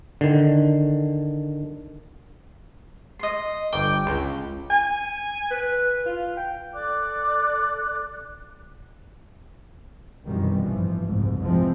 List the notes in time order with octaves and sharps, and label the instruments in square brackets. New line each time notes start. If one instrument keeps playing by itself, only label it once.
[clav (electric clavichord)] D3 D#3
[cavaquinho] D#5 C6
[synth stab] G1 G5 [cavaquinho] D6
[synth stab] C#2
[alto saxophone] G#5
B4
F4
G5
[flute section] A4 D5 D6 F#6
[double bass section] C2 F#2 B2 D#3 E3 G3
A1 G2 E3 F3
F#1 C2 G#2
G#2 C3 E3 F3 G#3 C4